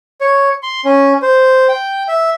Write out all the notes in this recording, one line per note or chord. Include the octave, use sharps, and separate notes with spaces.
C#5
C6
C#4
C5
G5
E5